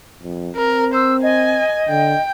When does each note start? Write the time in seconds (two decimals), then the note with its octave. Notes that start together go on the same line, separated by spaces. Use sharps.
0.23 F2
0.56 C4 A#4
0.94 C5 E6
1.23 D#5 G#5
1.89 D3 G5